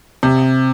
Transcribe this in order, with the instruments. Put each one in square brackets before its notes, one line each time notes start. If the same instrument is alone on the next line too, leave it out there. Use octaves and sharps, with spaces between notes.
[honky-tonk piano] C3